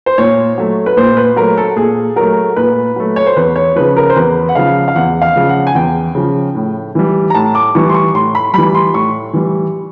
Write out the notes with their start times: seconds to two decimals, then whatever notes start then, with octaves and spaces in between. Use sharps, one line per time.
0.06 C5
0.18 A#2 C#5
0.58 F#3 A3
0.86 B4
0.97 A#2 C5
1.17 B4
1.36 F#3 A3 A#4
1.57 A4
1.76 A#2 G#4
2.16 F#3 A3 A#4
2.56 A#2 B4
2.96 F#3 A3
3.16 C#5
3.27 C5
3.36 E2 B4
3.56 C#5
3.76 C#3 F3 B4
3.97 A#4
4.10 C5
4.16 E2 B4
4.49 F#5
4.55 C#3 F3 F5
4.88 F5
4.96 E2 F#5
5.22 F5
5.36 C#3 F3
5.49 F#5
5.67 G#5
5.75 E2 G5
6.15 C#3 F3
6.55 A2
6.95 E3 G3
7.30 A#5
7.35 A2 A5
7.55 D6
7.75 E3 G3 C#6
7.89 C6
7.94 C#6
8.14 A2 C6
8.35 B5
8.54 E3 G3 B5
8.75 C6
8.94 A2 C#6
9.33 E3 G3